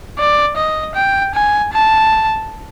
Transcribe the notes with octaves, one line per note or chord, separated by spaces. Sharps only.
D5
D#5
G5
G#5
A5